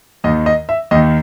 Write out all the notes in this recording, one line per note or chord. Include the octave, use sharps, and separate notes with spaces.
D#2 D#3 D#5
D#5
E5
D#2 D#3 D#5